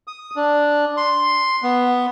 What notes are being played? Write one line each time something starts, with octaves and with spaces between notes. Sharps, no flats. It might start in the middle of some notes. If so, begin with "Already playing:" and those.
D#6
D4
C6
B3